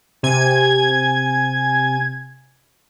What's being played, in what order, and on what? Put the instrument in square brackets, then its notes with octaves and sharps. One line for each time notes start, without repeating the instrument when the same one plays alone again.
[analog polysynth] C3 G#5 G#6